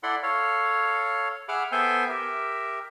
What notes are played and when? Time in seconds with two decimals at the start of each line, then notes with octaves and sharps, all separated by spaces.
0.03 E4 A4 D5 F#5 B5 C6
0.23 A4 C#5 F5
1.48 G#4 E5 F#5 B5 D6 F6
1.72 B3 A4 C5 E5 G5 G#5
2.09 G4 A#4 E5